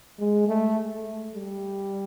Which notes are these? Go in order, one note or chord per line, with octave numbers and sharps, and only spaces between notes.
G#3
A3
G3